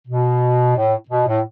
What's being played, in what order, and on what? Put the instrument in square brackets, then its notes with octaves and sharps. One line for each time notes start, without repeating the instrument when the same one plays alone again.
[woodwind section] B2
A2
B2
A2